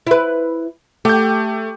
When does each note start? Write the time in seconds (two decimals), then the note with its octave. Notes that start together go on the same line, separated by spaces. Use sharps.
0.07 E4 B4
1.05 A3 G4 G6